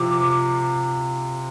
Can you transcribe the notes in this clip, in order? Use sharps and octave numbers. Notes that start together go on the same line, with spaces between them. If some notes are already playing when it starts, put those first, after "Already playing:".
Already playing: C3 F3 D6